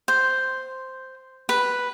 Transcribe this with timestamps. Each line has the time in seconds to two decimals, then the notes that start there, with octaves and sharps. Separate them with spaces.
0.08 C5
1.49 B4